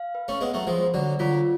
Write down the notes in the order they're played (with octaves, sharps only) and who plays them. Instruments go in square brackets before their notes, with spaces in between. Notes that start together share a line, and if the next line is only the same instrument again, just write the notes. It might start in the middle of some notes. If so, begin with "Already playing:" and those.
Already playing: [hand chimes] F5
B4
[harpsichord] A3 C#4
[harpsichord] G#3 B3 [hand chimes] F#5
[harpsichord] F#3 A3
[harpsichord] F3 G#3 [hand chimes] B4
[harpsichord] D3 F#3 [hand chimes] D5
[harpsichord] D3 F#3 [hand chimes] F4